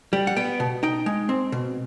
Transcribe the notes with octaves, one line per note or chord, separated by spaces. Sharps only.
G3
F#5
B3 G5
B2
D#4 G5
G#3
C4
B2